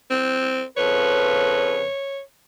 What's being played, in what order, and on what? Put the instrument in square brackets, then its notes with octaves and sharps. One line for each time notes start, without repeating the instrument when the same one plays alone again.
[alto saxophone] C4
[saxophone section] F2 C#3 B4 [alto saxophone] C#5